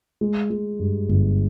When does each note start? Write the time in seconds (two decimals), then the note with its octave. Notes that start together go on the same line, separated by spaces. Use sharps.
0.21 G#3
0.50 G#3
0.79 G2
1.09 G1